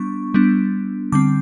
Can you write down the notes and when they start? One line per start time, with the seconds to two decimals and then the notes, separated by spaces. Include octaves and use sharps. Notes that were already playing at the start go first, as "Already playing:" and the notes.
Already playing: G3 B3 D4 C#6
0.34 G3 B3 D4
1.12 D3 G3 C4 D6